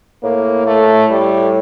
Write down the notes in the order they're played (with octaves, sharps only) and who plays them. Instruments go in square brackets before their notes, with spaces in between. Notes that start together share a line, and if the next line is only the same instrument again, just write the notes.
[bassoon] A2 [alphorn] A#3
[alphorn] A3
G3